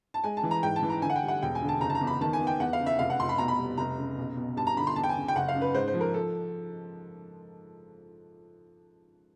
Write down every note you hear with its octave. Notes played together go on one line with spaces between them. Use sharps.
A5
G#3 G#5
A5
E3
A#5
G#2 G5
A5
E3
A#5
D3 G#5
F#5
G5
G3
F#5
E1 G5
G#5
D3
A5
F#1 A#5
A5
A#5
E2
B5
D#3 A5
G#5
B3
G5
E2 F#5
F5
C#3
E5
F1 F5
F#5
F1 C6
B5
B2 A#5
B5
G3
F1 A#5
C#3
B1
B2
G2 A5
A#5
D3 B5
C6
E2 A5
G5
G#5
C#3
G5
F#1 F#5
F5
F#2
B4
G#2 C5
C5
F3
A#4
A4